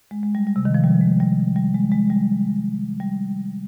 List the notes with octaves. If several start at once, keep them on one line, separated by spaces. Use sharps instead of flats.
G#3
G#3
G3
G3
C3
D#3
F3
G3
G#3
G3
G3
G#3
G#3
G3
G3